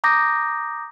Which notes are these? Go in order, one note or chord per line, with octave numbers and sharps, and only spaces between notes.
A#5 D6 D#6 G6 A#6